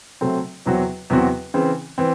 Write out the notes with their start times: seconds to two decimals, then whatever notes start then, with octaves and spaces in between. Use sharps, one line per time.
0.21 C3 F#3 A3 C4
0.66 E2 C3 F#3 C4 F#4
1.10 E2 C3 F#3 C4 F#4
1.54 C#3 E3 C4
1.98 E3 C4